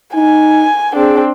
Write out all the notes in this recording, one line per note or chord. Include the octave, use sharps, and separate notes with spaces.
D#4 G#5
C4 D4 G#4